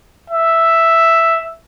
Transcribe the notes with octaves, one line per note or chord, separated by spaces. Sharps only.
E5